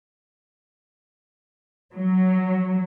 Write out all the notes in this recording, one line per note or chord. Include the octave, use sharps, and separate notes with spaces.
F#3